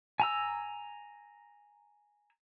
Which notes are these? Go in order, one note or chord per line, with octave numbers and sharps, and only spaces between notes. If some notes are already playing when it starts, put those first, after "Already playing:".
G#5 A#5 E6